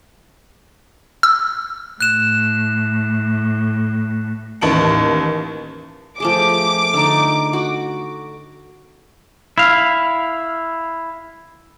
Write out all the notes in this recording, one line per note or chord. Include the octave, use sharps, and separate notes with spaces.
E6
A2 F#6 E7
A1 D#2 A5 D7 F#7
F3 A3 G#4 D6
D3 D#4
F#4
E4 F5